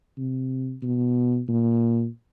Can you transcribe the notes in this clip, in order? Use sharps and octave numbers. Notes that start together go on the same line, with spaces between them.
C3
B2
A#2